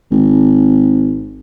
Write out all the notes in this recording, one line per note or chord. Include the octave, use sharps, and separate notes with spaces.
G#1